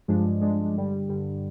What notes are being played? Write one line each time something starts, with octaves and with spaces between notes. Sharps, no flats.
G2 F3 G#3 D4
G2 F3 G#3 D4
G2 D3 G3
G2 D3 G3